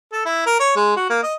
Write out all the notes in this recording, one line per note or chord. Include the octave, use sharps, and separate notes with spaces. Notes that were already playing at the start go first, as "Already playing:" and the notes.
A4
E4
A#4
C#5
G#3
F#4
A#3
D#5